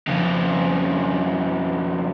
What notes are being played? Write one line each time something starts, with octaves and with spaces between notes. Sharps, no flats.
F2 C#3